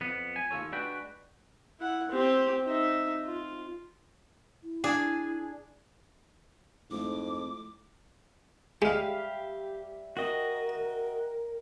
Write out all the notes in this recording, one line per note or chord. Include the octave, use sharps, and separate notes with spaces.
F2 B3
G#5
D#2 F4 A4 C#5
G#3 D4 F#4 B4 G5
E4 F#5
C4 G4
D#4 E5
F4
E4
D4 G#4
F2 G#2 G#3 A3 E4 D6
G3 G#3 G4 E5 F5
F#4 A#4 D#5 G5